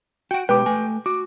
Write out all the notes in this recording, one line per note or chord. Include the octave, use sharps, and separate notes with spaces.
F#4 F#5 G5 D7
B2 G#3 G4 B4 G5 D6
A3 G#5
F#4 D6